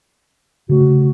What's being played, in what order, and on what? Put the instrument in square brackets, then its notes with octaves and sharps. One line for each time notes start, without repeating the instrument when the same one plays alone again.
[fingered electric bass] C#3 A3 [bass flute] F#4